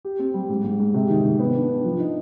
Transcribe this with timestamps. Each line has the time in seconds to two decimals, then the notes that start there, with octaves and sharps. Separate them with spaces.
0.05 G4
0.19 C4
0.34 G3
0.49 G#2
0.64 G#2
0.79 G#2
0.94 C3
1.10 D#3
1.24 D#3
1.39 B3
1.55 D4
1.70 D4
1.84 F3
2.00 D#4